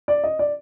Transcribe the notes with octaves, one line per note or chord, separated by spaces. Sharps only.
D5
D#5
D5